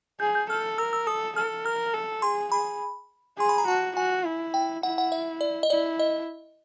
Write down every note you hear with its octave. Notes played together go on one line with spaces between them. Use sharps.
G#4 G6
G6
A4 F6
A#4 E6
E6
A4 D#6
A4 F6
A#4 F6
A4
G#4 C6
G#4 B5
G#4 C6
B5
A#5
F#4 A5
F#4 G#5
E4
G5
E4 F#5
F#5
E5
D5
D#5
E4 D5
D#5